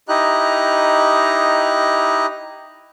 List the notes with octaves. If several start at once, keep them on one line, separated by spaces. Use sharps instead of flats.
D#4 E4 G4 D#5 A#5 F#6